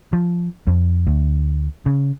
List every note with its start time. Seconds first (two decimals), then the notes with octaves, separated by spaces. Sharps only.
0.13 F3
0.67 F2
1.07 D2
1.86 C#3